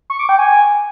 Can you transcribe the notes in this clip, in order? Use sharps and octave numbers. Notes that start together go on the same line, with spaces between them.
C#6
D6
G5
G#5